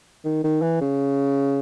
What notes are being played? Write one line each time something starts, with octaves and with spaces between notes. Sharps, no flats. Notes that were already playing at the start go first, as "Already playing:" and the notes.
D#3
D#3
E3
C#3